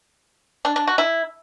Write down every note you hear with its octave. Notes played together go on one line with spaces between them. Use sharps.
D4
D4
F#4
E4